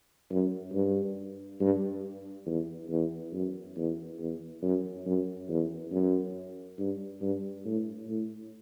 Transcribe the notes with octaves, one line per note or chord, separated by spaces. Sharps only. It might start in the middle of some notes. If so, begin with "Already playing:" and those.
F#2
G2
G2
E2
E2
F#2
E2
E2
F#2
F#2
E2
F#2
G2
G2
A2
A2